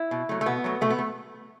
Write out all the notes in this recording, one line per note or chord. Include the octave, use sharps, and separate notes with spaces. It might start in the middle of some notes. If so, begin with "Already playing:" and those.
Already playing: E4
B2
F#3 A3
A3
B2 B3
F#3 A3
B2 A3
B3
A3